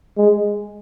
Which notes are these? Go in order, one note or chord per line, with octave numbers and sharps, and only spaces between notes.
G#3